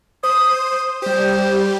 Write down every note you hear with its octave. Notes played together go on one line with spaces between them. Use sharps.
C5 D#6
G3 G4 C5